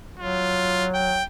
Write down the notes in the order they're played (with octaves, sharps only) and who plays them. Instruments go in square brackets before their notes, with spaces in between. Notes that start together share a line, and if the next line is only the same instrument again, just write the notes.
[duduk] F#3 [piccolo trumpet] F4
[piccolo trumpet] G5